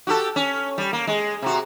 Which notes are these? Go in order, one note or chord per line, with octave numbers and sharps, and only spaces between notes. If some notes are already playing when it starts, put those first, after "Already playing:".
F#4 G4 A4
C#4
G3
A#3
G#3
C3 F#4